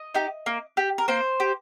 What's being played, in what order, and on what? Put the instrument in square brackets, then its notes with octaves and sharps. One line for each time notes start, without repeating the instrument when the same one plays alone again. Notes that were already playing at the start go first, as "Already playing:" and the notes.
Already playing: [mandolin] D#5
D#4 G4
A#3
G4
A#4
A#3 C5
G4